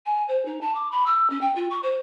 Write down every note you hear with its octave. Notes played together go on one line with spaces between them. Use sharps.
G#5
C5
D#4
A5
D6
B5
E6
C#4
G5
F4
C#6
C5